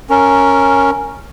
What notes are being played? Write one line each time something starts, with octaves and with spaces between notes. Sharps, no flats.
C#4 A#4